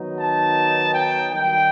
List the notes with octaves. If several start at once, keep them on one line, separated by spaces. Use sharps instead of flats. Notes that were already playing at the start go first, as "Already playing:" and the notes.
Already playing: D#3 F#3 B3 D#4
A5
G5
D#3 G3 D#4 G5